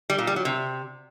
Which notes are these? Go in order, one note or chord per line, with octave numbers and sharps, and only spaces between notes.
G3
A#2
G3
F#3
C3